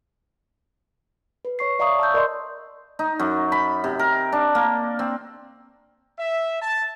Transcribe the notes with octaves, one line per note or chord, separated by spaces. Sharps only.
B4
C#5 C#6 C7
D5 E5 F5 A#5 C#6 D#6
A5 E6 G6
A#4 D5 D#5 B5 C6
D#4
F#2
B5
C3
A#4
D4
A#3
C4
E5
A5